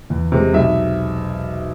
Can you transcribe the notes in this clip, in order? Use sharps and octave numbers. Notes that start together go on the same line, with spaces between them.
E2
C3 G#3
B1 E5